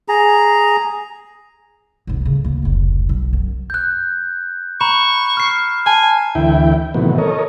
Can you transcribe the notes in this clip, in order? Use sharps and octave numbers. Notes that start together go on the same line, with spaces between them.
G#4 A#5
C2 G#2
A2 C#3
D2 A#3
F1 C#2
B1 F#3
F#2
F#6 G6
A#5 B5 C#6 E7
F6 C7
G#5 A5
D2 E3 E4 G5
A2 C3 D#3 E3 F#3 B3
A4 A#4 C#5 D#5